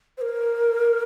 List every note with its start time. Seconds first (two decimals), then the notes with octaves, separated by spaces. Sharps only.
0.18 C5
0.22 A#4